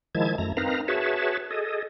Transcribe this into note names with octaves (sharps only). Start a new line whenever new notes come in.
D#3 F3 G#3 E4 A5 G#6
F#2 A3 A#5
C4 D#4 A#4 B4 F5 A#5
F#4 G#4 B4 C#5 E5 A5
G#4 A4 D#5